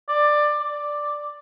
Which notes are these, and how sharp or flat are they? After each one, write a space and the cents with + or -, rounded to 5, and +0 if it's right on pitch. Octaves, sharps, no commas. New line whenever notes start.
D5 +15
D5 +5